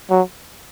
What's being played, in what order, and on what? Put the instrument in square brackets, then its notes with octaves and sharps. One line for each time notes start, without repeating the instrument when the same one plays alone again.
[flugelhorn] F#3